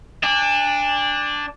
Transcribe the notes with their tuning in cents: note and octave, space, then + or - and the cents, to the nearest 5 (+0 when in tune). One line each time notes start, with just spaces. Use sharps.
D4 +0 G#5 -45